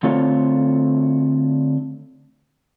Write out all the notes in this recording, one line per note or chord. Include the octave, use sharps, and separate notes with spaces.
D3 A3 C4 F4 A4 C#5